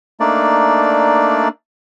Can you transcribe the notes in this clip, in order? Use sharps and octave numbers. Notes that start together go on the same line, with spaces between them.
A3 A#3 D4 D#4 D5